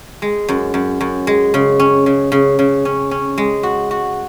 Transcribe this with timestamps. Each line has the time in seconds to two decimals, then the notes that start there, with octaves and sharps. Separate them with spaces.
0.22 G#3
0.48 F#2
0.74 F#2
1.01 F#2
1.27 G#3
1.54 C#3
1.79 C#4
2.06 C#3
2.32 C#3
2.59 C#3
2.85 C#4
3.11 C#4
3.38 G#3
3.63 F#4
3.91 F#4